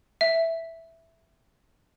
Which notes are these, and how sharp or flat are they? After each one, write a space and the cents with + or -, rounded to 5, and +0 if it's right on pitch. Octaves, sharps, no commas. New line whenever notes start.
E5 +0